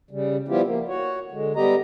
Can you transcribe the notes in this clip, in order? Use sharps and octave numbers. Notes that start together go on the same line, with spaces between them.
C#3 G3
F3 G3 B3 E4 F4 G4
A#3
F#4 C#5
D3 G#3
G3 B3 G4 D#5 A#5